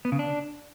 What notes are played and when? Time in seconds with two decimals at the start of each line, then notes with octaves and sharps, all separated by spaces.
0.05 B3
0.12 C#3
0.19 D4